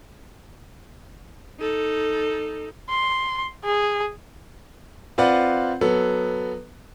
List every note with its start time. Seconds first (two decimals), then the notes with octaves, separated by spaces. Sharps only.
1.60 D#4 A4
2.90 C6
3.64 G#4
5.18 C4 F4 B4 D5 F#5
5.81 F#3 B3 A4